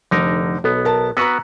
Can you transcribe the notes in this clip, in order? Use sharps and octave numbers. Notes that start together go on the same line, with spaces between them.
F1 D3 D#4 A#4
B1 B3 A4
A#4 A5
B3 F#4 B4 A#5 C#6 E6